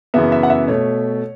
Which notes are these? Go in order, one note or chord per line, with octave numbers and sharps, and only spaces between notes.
F#2 C#3 E3 B3 E5
E5
F#5
E5
B2 A3 C#5